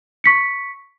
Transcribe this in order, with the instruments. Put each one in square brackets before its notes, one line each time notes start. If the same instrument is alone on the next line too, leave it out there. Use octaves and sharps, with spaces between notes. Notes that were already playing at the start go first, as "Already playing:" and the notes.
[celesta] C#6 B6 C#7